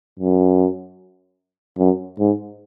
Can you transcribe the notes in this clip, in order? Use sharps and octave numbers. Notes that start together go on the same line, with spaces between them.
F#2
F#2
G#2